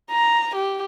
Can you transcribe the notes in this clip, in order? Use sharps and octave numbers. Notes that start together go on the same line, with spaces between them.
A#5
G4